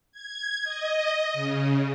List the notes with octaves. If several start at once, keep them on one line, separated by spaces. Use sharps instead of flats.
G#6
D#5
C#3